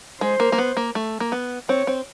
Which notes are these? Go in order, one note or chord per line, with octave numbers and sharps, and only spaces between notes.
G#3 C5
A#3
A#3
B3
A#3
A3
A#3
B3
C4 C#5
C4